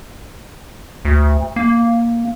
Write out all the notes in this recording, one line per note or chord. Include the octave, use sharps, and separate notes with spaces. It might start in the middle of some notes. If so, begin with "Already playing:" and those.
D2
A#3